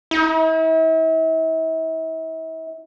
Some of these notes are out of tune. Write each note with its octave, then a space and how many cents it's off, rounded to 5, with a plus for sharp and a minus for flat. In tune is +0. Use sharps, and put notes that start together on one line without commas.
E4 -40